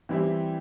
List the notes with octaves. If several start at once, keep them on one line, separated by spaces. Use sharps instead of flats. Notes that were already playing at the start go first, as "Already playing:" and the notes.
E3 G3 C4 E4 G4